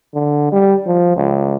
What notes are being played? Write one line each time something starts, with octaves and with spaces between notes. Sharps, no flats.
D3
G3
F3
C#2